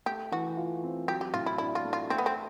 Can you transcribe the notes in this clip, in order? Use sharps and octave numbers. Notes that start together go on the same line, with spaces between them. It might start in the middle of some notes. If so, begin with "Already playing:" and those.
A3 G4
E3 F#4
F4
C4
F#3 G4
G4
A2 F4
E4
D4 E4
F4
A3
F4
A3 C4
B3
C4